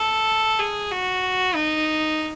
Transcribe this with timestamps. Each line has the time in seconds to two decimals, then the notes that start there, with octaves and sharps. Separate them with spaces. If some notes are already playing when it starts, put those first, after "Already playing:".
Already playing: A4
0.59 G#4
0.91 F#4
1.55 D#4